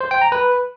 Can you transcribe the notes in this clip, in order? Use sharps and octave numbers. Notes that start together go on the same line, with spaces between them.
C5
G5
A#5
B4